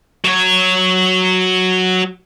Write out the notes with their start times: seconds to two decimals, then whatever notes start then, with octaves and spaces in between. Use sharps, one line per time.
0.25 F#3 C#5